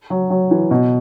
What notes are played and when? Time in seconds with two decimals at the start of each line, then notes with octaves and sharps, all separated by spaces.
0.10 F#3
0.30 F#3
0.51 E3
0.71 B2